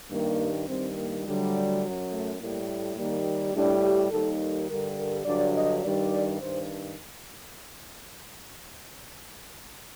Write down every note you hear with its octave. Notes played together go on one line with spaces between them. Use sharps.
G2 D#3 G3 A#3
G2 D#3 G3 C4
A#3
D2 D3 F#3 G3
F#2 F#3
A3
A2 G3 A#3
A3
D#2 D#3 G3 A#3
A2 G3 D4
G4
D#2 D#3 G3 A4
A4
G2 D3 G3 A#4
A#4
G2 D3 F#3 D5
D#5
G2 D#3 G3 D5
G2 D#3 C5